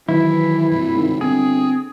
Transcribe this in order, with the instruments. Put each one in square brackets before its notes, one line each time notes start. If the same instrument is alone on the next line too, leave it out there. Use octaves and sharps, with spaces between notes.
[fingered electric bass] D#3 F#3 [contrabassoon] E3 [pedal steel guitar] E4
[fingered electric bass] G2 C3
[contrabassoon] G#1
[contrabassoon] G1 [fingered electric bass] C4 [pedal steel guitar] G#4